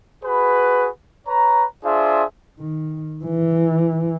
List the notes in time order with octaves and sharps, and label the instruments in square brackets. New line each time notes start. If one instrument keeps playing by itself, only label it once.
[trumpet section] F#4 G#4 B4
B4 C#5 A#5
D4 F4 G#4 C5 E5
[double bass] D#3
E3